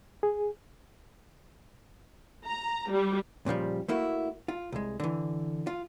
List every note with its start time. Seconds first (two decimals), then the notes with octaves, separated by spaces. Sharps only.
0.23 G#4
2.45 A#5
2.90 G3
3.46 A#2 C#3 F3 G3
3.88 A3 A#3 E4 F#4
4.48 F4
4.72 C2 G#3
5.00 D3 E3
5.67 F4